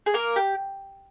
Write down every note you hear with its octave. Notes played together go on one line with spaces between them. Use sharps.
G#4
A#3 A#4
G4